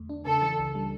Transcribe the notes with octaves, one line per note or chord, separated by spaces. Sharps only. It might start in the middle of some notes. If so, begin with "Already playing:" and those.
Already playing: E2 D3 A3
D4
C#3 A4
E3
C#2
G3